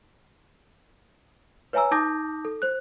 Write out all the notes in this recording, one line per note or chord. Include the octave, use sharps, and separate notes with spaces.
B4 C#5 E5 G#5 A#5 E6
D#4 A5 D6 D#6 G6 A#6
A4
C5 F#6